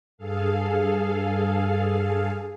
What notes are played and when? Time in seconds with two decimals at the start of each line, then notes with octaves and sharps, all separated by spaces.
0.18 G2 G#4 A4 F5